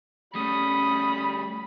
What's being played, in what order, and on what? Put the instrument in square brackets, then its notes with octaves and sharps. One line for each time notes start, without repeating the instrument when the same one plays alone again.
[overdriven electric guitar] G3 A3 [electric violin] C#4 D#6 [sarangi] B5